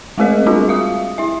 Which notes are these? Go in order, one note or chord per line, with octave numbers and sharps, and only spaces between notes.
G#3 A3 C4 G#4 A#4 D#5
G3 C4 D4 F4 F#4 G#4
E5 F5 D#6
E4 E5